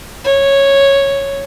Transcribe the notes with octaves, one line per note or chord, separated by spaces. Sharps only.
C#5